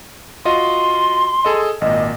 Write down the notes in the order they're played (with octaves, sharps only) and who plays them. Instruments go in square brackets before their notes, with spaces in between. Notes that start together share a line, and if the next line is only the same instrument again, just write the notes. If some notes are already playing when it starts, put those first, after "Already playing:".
[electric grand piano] F4 F#4 D#5 [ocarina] C6
[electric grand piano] G#4 A4 D#5
[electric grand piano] G#1 A#2 [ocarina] D#5